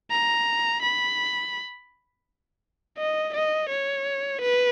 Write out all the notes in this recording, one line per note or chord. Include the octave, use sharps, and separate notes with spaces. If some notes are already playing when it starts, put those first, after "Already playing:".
A#5
B5
D#5
D#5
C#5
B4